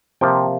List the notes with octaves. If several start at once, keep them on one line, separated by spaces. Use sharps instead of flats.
C3 F3 A#3 F4 G5